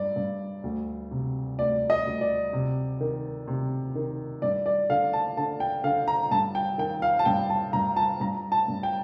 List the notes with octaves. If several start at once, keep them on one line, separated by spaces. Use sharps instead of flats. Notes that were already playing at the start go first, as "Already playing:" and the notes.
Already playing: G2 D5
G2
D2
C3
D2 D5
D#5
D2
D5
C3
D#3
C3
D#3
G2 D5
D5
D3 F5
A5
D3 A5
G5
D3 F5
A#5
G2 A5
G5
D#3 G5
F5
A5
G2 G5
A5
G2 A#5
A5
G2 A#5
A5
G2
G5